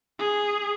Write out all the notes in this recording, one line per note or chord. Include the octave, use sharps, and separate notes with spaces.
G#4